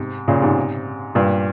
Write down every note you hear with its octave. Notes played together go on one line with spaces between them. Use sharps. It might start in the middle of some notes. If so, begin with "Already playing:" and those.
Already playing: G#2 C3
A#2 C#3
G#2 C3
G2 A#2